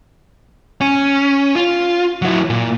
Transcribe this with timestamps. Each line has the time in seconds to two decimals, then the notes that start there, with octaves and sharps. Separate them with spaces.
0.81 C#4
1.56 F4
2.22 F#3 E4
2.50 A#2